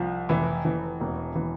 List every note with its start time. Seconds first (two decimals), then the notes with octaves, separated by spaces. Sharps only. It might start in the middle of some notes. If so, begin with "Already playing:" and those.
Already playing: C2 F3
0.29 F1 E3 E4
0.65 E3
1.01 E1
1.35 E3